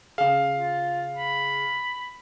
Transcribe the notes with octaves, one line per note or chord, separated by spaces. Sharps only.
C#3 G#4 F5
F4
B5